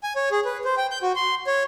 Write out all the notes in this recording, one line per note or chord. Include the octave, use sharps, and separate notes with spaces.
G#5
C#5
G#4
B4
C5
G5
G6
F#4
C6
C#5